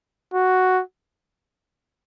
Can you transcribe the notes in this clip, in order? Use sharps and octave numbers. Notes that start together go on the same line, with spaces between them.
F#4